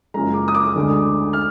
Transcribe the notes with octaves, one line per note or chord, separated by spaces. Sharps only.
F#1 F#2 F3 G#3 A#5
D6
D#6
D6
D2 D3 G#3
F6